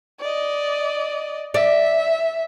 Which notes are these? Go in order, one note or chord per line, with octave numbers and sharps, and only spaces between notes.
D5 D#5
D5 E5